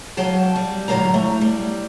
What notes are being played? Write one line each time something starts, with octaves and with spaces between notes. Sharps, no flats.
F#3 F5 G5 A5
G3
A2 D3 F#3 A3 F5 A#5
A3
G3